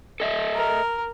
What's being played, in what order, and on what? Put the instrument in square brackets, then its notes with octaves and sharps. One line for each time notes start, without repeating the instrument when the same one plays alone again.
[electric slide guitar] A4 D#5 E5
[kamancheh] A#4